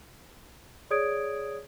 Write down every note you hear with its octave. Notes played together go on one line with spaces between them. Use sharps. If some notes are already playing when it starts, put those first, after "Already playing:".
G#4 C#5 D5 D#6 G#6 D7